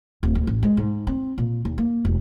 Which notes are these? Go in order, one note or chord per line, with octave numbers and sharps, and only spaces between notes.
D1
D2
A1
G#3
G#2
C4
A#2
D#2
A#3
E1